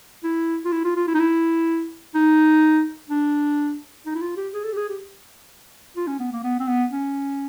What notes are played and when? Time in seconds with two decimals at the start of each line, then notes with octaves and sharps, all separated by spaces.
0.24 E4
0.65 F4
0.72 E4
0.84 F4
0.96 F4
1.08 E4
1.15 D#4
1.20 E4
2.15 D#4
3.09 D4
4.06 D#4
4.15 E4
4.21 F4
4.37 G4
4.54 G#4
4.64 A4
4.73 G4
4.77 G#4
4.89 G4
5.96 F4
6.07 C#4
6.19 B3
6.32 A#3
6.43 B3
6.60 C4
6.68 B3
6.91 C#4